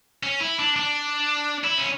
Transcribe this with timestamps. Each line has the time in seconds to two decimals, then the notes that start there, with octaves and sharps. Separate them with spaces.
0.23 C#4
0.40 E4
0.59 D4
0.76 D4
1.64 E4
1.78 C#4